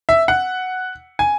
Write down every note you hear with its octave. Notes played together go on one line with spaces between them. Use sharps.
E5
F#5
G#5